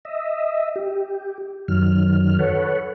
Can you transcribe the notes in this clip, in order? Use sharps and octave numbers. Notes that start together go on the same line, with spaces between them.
D#5 E5
G4
F#2 D#3 F#3 F6
A4 B4 C#5 F#5